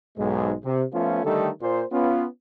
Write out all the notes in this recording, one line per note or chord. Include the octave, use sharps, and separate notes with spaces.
B1 G#2 G#3
C3
F3 A3 B3 C#4 F4
D3 D#3 G3 A3 D#4 A4
A#2 C5
B3 C#4 F4